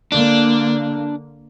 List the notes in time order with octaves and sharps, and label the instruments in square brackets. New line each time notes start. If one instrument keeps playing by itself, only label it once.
[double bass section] D3 A#3 [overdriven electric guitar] D4